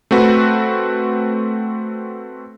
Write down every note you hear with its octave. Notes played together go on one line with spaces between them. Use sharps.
A3 C4 F#4 B4